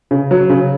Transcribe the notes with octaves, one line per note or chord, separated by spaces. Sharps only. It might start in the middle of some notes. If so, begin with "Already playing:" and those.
C#3
F#3
C#3